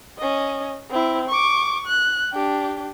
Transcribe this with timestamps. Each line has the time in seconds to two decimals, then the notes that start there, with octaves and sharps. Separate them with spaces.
0.18 C#4 D#5
0.90 C4 E4
1.29 C#6 D6
1.87 F#6
2.33 D4 G4